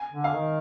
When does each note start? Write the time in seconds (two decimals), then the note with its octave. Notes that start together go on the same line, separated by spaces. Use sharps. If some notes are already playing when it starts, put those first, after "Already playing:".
Already playing: G#5
0.11 D3
0.24 F5
0.36 D#3